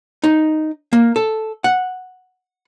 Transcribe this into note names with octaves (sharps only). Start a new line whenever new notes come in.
D#4
A#3
A4
F#5